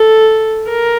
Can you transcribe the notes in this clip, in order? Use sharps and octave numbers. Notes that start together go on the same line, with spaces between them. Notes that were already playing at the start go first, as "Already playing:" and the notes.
Already playing: A4
A#4